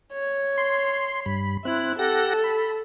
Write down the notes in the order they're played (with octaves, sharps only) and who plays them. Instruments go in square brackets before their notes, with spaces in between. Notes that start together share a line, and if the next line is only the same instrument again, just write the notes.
[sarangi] C#5
[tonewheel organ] C6
G2 B5
[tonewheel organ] C4 F#6 [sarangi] E4
[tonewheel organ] G4 F#5 A#6 [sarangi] A4
[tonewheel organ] B5